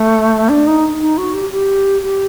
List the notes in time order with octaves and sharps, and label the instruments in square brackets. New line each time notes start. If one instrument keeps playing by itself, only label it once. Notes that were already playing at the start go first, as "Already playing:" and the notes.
Already playing: [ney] A3
D4
D#4
D#4
F#4
G4
G4
G4